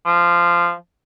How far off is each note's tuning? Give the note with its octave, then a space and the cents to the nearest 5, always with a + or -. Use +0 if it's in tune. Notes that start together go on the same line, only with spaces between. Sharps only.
F3 -15